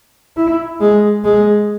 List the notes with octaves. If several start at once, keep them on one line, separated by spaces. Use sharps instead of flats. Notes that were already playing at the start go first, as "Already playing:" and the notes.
E4
G#3
G#3